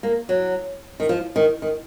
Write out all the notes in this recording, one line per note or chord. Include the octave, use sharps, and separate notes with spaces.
A#3
F#3
D#3
F3
D#3
D#3